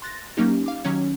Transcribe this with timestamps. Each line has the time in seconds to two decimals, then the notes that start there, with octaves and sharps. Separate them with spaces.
0.02 C6 F#6 A6 A#6
0.37 F#3 A#3 C#4 D#4 G4
0.66 F5 D6
0.85 D#3 F#3 C#4